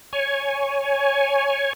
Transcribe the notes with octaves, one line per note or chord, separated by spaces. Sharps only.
C#5 G#5